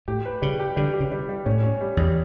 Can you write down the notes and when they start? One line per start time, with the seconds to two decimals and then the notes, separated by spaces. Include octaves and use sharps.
0.08 A2 G4
0.25 B4
0.42 C#3 G3
0.60 G4
0.76 D3 G3
0.94 G4
1.00 C#3
1.12 G3
1.29 G3
1.46 A2 C#4
1.63 C#4
1.81 G3
1.97 E2 G3